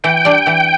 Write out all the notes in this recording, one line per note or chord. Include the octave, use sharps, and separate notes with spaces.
E3 G5
G3 D4
E3